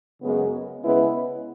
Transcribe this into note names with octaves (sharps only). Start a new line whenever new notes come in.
F#2 C#3 G#3 B3
C#3 G#3 B3 E4 B4